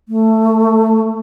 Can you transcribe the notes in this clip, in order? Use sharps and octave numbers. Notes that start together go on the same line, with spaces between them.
A3